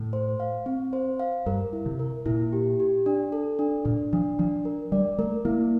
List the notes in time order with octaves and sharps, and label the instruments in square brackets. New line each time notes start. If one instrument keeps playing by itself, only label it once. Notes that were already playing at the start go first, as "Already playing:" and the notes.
Already playing: [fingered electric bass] A2
[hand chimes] C5
F5
C4
C5
F5
[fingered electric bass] G2 [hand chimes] A#4
[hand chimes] E4
[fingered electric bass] C3
[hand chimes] A#4
[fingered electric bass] A#2 [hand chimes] E4
[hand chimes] G4
G4
D4
A4
D4
[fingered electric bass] A#2 [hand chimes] D4
[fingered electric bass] F3 [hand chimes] D4
[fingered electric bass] F3 [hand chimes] D4
[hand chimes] A#4
[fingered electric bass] G3 [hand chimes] D5
[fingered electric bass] A3 [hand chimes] A#4
[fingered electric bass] A#3 [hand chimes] E4